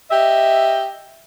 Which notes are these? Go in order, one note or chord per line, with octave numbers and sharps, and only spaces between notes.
G4 D#5 E5